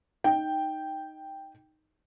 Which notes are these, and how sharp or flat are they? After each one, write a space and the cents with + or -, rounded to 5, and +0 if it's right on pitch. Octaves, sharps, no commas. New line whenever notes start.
D#4 +0 G5 +0